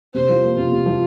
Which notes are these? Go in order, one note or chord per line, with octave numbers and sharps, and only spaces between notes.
C3 C5
F3
A#3
C3 F4
C3
F3